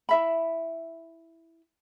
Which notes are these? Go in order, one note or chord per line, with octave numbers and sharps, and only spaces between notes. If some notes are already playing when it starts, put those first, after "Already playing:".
E4 E5 B5